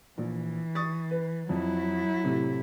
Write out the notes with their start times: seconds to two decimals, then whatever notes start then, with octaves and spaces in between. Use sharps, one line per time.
0.18 A#1 E3
0.75 C#6 D#6 A6
1.11 B4
1.49 F2 F#3 E4
2.23 A2 C3